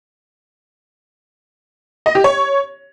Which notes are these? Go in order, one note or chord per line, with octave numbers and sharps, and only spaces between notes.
D#5
G4
C#5